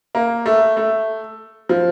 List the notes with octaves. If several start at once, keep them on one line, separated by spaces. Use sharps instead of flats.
A#3
A3
A3
F3